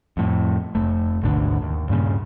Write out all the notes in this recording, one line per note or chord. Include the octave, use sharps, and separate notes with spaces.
F2 A2
F1 A3
G#1 D2 B2 D3
D#2
G2 A#2 C#3